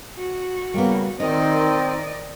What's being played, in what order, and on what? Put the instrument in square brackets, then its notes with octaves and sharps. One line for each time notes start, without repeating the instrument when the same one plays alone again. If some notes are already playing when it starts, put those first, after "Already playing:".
[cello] F#4
[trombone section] C#3 A#3 [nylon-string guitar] G3 B3
[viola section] D#3 [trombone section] C4 [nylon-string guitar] D#4 [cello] D5 D#5